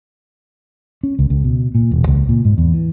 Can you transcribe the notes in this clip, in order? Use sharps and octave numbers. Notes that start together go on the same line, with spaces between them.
C#4
C#2
C#2
B2
A#2
E1
C#2
A#2
G#2
E2
E3